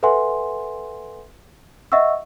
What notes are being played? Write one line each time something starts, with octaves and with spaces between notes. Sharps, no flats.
A4 B4 E5 F#5 G#5 C6
D#5 E5 F#5 C#6 E6